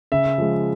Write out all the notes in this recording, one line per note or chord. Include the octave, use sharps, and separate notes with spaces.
C#3 E5
F3 G#3